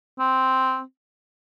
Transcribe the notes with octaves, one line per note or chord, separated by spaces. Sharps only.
C4